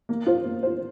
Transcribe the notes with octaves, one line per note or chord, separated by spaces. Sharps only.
A#3
F4 C5
A#3
F4 C5